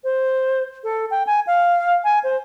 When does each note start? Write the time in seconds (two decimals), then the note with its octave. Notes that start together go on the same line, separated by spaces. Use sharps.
0.04 C5
0.84 A4
1.11 G5
1.27 G#5
1.47 F5
2.04 G#5
2.23 C5